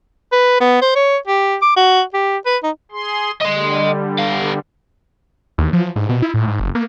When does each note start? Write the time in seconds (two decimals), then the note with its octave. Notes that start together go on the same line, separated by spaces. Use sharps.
0.32 B4
0.60 B3
0.82 C5
0.95 C#5
1.27 G4
1.62 D6
1.76 F#4
2.14 G4
2.46 B4
2.63 D#4
2.92 G#4 C6
3.41 D3 G3 D#5 C6
4.19 B3 F5
5.58 D#2
5.73 F3
5.96 G#2
6.09 B2
6.22 E4
6.34 A2
6.47 G#2
6.60 F#1
6.75 A#3